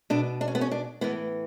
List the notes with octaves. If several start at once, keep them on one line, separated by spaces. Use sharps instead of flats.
B2 D4
D4
C#4
B3
C#4
D4
A2 E3 B3